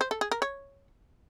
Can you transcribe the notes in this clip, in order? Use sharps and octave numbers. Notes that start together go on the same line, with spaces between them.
C5
A4
G#4
A#4
C#5